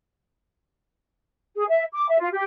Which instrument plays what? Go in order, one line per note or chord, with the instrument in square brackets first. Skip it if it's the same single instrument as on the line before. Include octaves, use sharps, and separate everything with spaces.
[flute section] G#4
E5
D6
E5
F4
G4